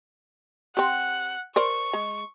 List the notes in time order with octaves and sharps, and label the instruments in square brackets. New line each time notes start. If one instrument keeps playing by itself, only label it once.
[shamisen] C4 G4 [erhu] F#5
[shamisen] A#4 C5 D5 [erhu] C#6
[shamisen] G#3